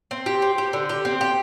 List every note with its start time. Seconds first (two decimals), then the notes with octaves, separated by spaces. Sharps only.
0.11 C4
0.26 G4
0.42 C4
0.58 G4
0.73 D3
0.89 G4
1.05 C4
1.21 G4